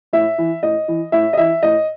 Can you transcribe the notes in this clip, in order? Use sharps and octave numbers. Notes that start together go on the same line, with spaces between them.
A2 E5
E3
A2 D#5
E3
A2 E5
D#5
E3 E5
A2 D#5